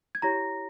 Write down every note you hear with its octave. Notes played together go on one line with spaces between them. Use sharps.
G#6
E4 G4 C#5 A#5 A#6